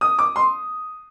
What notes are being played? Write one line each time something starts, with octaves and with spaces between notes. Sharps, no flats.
D#6
D6
C6